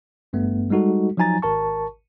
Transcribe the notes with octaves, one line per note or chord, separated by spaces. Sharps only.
G#1 G2 A3 B3
G3 G#3 D#4 F#4 A4
F3 F#3 D#4 G#5 A#5 A6
G#1 A#4 A5 C#6